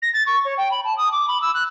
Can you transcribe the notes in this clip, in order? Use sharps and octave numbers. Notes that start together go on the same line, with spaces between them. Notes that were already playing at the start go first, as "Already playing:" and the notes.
A#6
A6
C#6
C#5
G5
B5
A5
D#6
D6
B5
E6
F#6